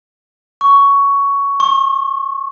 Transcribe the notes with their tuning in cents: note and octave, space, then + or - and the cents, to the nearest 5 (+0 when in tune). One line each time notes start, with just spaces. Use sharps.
C#6 +10
C#6 -40